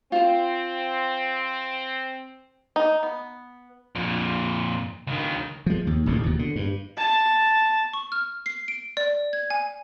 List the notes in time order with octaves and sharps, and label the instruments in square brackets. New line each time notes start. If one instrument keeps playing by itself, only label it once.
[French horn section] C4 [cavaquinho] F4 C5
[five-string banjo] D#4
B3
[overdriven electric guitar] F2 A#2
C#2 D#3
[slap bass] F3 G#3
D#2
D#1 A1 G#2 C3
D#2 B2
D3
G2
[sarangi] A5
[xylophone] C#6
F6
C7
D7
D5
G#6
G#5